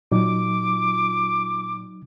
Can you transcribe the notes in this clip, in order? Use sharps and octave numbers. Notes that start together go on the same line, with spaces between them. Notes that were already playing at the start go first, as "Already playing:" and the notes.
A#2 F#3 D#4 D6